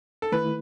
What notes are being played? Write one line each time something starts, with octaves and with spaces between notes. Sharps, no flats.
A4
D#3 A3 E4 B4